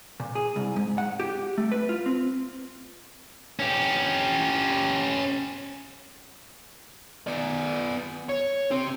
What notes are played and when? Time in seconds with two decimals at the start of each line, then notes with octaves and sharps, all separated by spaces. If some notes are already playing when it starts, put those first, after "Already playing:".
0.20 A#2
0.35 G#4
0.56 C2
0.76 G#2
0.98 F#5
1.20 G4
1.58 A3
1.72 B4
1.89 F4
2.06 C4
3.60 C#4 G4
7.27 B3 D5
8.29 C#5
8.71 C4 G4